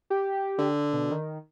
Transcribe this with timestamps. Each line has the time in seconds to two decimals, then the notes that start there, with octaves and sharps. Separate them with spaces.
0.10 G4
0.59 D3
0.93 B2
1.11 D#3